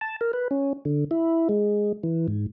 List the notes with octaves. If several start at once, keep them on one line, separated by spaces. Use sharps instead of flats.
A5
A#4
B4
C#4
D3
E4
G#3
E3
G#2